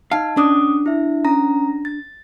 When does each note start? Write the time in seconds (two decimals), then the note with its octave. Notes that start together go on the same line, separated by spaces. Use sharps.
0.11 D#4 F5 A5
0.37 C#4 D4 D6 D#6
0.86 E4 E5
1.25 C#4 A#5 A#6
1.85 A6